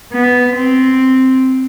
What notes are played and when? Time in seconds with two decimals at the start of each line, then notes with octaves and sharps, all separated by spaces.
0.13 B3
0.56 C4